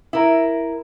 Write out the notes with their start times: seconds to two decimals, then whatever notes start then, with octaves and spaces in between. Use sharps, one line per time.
0.13 E4 A#4